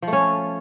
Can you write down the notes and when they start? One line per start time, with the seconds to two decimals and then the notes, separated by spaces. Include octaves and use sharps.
0.02 F3
0.07 A3
0.13 C#4